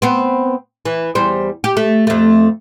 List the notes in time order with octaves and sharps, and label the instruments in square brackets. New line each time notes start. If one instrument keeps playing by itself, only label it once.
[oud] B3 C4
E3
E2 G3 C5
G4
A3
F2 A3